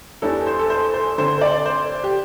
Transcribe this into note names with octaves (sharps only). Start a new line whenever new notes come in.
E2 E3 G3 D4 A4
C5
A4
C5
C5
D3 C4 C5
C5
D5
C5
G4